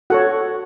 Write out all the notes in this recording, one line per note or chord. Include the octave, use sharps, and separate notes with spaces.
F#4 A4 C#5 F#5